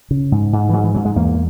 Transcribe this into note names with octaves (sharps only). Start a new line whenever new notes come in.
C#3
G#2
G#2
E3
G#2 F#3
E3
G#2 F#3
G#3
E2 A#3